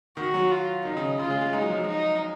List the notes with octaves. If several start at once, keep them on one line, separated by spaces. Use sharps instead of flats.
D#3 F#4
F#3
F4
D#3 D#4
C#3
C#3 F4
G#3
G#3
G#3 D#4
F#3
F3
F#3
D#4